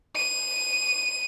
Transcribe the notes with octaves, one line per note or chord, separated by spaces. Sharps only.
D#7